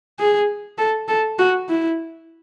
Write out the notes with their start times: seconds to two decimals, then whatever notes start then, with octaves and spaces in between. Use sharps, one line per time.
0.19 G#4
0.78 A4
1.08 A4
1.38 F#4
1.68 E4